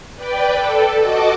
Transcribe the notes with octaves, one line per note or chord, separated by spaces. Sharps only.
B4 D5 G5
A4
F#4 D#5 A5 D6